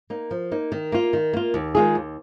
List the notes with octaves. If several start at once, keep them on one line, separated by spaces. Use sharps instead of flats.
A#3 D#4
F3
A#3 D#4
D#3
A#3 F4
D#3
A#3 F4
D#2
D#3 G#3 F4 G#4
D#2